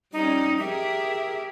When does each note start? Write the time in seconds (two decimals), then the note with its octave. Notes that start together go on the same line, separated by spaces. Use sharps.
0.13 G3 C#4 D#4
0.59 G4 G#4 A#4 E5